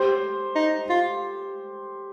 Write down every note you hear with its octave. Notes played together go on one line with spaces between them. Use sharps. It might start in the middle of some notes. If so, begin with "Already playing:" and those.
Already playing: G4 C5
D#4
F4